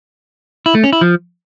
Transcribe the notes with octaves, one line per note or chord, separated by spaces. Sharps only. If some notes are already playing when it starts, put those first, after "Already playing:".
E4
A3
C#4
E4
F3